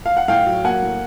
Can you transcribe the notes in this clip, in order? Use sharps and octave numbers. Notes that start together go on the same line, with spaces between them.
F5
F#5
A2 F5 G5
F#3
A#3 F#5 G#5
A2